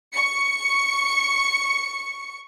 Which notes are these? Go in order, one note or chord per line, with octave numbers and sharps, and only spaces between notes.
C#6 C#7